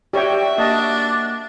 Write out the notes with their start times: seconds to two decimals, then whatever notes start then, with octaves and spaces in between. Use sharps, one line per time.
0.13 F#4 G4 C#5 D5 E5 G5
0.58 A#3 D4 D#5 F#5 A5 A6